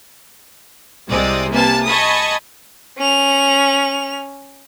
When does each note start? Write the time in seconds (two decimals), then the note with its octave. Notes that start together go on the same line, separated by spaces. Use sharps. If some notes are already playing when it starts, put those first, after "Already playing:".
1.08 C2 C3 G#3 C4 D5 D#6
1.50 C3 A#3 B4 G#5 A5
1.86 D#5 G#5 A5 B5 C#6 D#6
2.98 C#4 F7